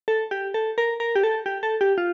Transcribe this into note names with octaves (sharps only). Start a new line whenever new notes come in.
A4
G4
A4
A#4
A#4
G4
A4
G4
A4
G4
F4